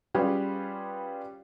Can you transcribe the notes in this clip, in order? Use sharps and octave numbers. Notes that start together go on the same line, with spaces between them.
G3 C#4 F4 G4 G#4 B4